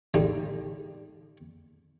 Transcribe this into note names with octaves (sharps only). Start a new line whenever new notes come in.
A2 D3 G#3 D#4 G4